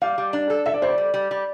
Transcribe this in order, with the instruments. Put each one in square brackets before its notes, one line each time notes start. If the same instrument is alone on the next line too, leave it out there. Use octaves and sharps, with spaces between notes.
[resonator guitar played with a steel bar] G3 [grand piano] F5
[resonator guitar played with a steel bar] G3
D4
A4
[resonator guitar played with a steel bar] A4 [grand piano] E5
[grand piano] D5
[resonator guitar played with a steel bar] G3 [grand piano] C5
[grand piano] D5
[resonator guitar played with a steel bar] G3
G3
G3